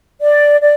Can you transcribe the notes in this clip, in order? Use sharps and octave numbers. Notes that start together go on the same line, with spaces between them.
D5
D5